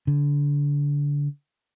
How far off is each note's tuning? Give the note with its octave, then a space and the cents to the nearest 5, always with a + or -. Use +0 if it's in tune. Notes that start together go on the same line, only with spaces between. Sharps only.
D3 -25